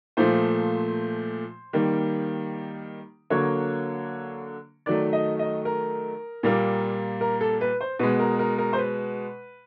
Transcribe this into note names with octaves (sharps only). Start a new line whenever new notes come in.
A#2 F3 A3 C5
D#3 G3 A#3
D3 F#3 A#3 C#5
D#3 F#3 A3 D5
D#5
D#5
A#4
A#2 G3 A#3
A#4
A4
B4
C5
B2 G#3 B4
A#4
A#4
A#4
C5
B4